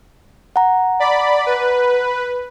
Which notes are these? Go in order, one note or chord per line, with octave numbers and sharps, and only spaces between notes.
F#5 A#5
D5 B5
B4